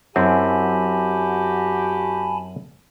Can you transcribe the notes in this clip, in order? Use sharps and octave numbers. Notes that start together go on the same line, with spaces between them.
F#2 C4 E4 F#4 G4 G#5 A5 B5